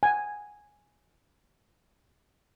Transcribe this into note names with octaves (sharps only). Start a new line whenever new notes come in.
F#5 G#5